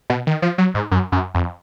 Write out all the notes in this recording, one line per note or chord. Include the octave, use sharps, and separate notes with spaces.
B2
D#3
F3
F#3
G#2
F#2
F#2
F2